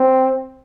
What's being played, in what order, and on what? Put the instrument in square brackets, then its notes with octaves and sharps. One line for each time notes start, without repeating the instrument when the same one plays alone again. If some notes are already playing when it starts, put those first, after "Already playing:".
Already playing: [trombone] C4